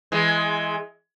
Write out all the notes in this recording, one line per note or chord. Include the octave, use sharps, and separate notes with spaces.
E3 G#3